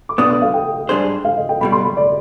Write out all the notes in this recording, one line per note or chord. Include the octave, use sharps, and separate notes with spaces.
D6
B1 B2 B3 D4 D#6
D#6
F5
G5
G#2 G3 D4 G#4 C5
F5
D#5
G5
B1 B2 G3 B5
C6
B5
D5